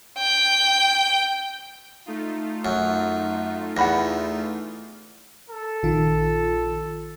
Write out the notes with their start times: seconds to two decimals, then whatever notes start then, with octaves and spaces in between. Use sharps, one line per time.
0.19 G5
2.06 A3 D#4 F4
2.65 F#2
3.77 E2 F#5 B5 A#6
5.50 A4
5.83 A#1 D#3 F4